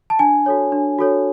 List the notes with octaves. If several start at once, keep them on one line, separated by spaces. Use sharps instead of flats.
A5
D4 G#5
F#4 A4 C#5
D4
F#4 A4 C#5